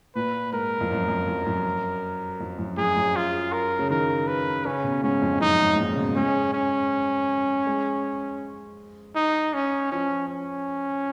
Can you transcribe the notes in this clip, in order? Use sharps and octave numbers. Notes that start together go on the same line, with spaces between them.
A#2 B4
G#2 A#4
F2
F#2
F2
F2
F#2
F2
F#2
F#2 G#4
F#2
F4
A#4
C#3
D#3 A#4
B4
C#3 C#4
B2
G#2 C#4
F2
F#2 D#4
G#2
G#2
A#2
C#3
B2
G#3 C#4
C#4
G#3
D#4
C#4
F3 C#4
C#4